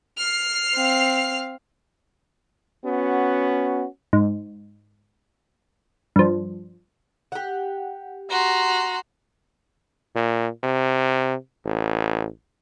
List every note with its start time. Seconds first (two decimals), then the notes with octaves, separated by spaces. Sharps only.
0.18 F6 C7
0.77 C4 F5
2.84 B3 C#4 F#4
4.13 G#2
6.16 G2 F3
7.32 G4 F#5
8.31 F#4 A#5 C6
10.16 A#2
10.64 C3
11.66 A1